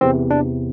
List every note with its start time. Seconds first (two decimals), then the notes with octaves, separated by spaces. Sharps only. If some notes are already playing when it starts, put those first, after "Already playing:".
0.01 E2 C3 E3 C4
0.31 D4